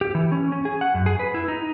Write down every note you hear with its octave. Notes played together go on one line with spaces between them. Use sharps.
G4
E3
C#4
C#4
G#4
F#5
F#2
G#4
B4
E4
D#4